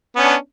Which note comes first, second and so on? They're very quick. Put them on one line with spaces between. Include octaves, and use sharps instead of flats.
B3 C#4 D4